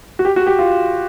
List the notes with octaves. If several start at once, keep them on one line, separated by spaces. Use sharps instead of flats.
F#4
G4
F#4
G4
F4